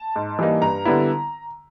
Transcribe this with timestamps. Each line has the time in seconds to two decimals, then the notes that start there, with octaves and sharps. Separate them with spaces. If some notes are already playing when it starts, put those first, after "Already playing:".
Already playing: A5
0.16 G#2
0.39 E3 G3 A#3 D#4
0.62 G2 A#5
0.86 D3 G3 B3 E4